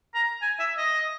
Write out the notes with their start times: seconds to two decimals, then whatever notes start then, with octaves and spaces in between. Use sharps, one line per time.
0.15 A#5
0.42 G#5
0.59 E5
0.77 D#5